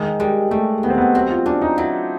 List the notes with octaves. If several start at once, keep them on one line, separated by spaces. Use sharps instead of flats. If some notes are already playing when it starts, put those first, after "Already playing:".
Already playing: D#3 G#3
G3 G#3
G3 A3
D#3 B3
C4
B3
F#3 C4
F4
C#4 D4
D#4
F#3 E4